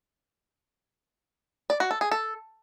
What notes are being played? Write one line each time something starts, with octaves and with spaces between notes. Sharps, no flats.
D5
F#4
A4
G#4
A4